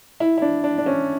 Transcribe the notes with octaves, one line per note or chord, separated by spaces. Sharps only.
E4
E4
D4
D4
D4
C#4